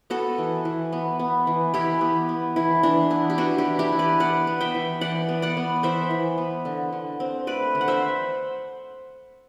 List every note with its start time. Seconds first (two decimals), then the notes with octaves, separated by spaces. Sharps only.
0.10 B3 F#4 A4
0.38 E3
0.65 E3
0.93 B3
1.19 B3
1.47 E3
1.74 E3 E4 G4
2.01 B3
2.29 B3
2.56 E3 E4
2.83 E3 D4
3.10 B3 E4
3.30 G4
3.38 B3 D4 F#4
3.58 E4 G4
3.65 E3
3.79 E4 G4
3.93 E3
3.99 B4 D5
4.20 B3 D5 F#5
4.47 B3
4.61 E5 G5
4.74 E3
5.01 E3 D5 F#5
5.29 B3
5.42 D5 F#5
5.57 B3
5.83 E3 C5 E5
6.11 E3
6.38 B3
6.65 D3
6.93 D3
7.20 C4
7.47 A3 B4 D5
7.75 D3
7.81 F#5
7.88 C5 E5